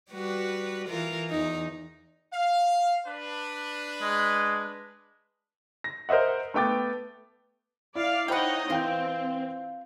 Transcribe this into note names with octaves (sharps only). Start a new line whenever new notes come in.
G3 F#4 B4
E3 F4 A#4
E2 D#4
F5
D4 B4
G#3
A#6
A#4 C5 D#5 E5 F#5
A3 B3 G5 D6 A6
E4 D5 F5
D#4 E4 C5 C#5 D#5 F#5 G5 B5
E3 C4 F4 G5 G6